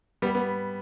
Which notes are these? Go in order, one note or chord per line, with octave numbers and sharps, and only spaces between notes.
G3 B3
B3